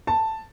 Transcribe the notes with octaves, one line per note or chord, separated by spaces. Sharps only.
A5